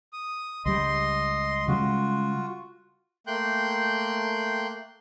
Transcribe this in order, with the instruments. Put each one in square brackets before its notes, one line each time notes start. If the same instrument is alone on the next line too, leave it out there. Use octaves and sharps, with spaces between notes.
[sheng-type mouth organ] D#6
[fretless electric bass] C#2 G3 [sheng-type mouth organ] D#5 C6
[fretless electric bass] C#3 G3 G#3 [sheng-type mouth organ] F4 F#4
[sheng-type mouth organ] A3 A#3 G5 C6 F#6 G6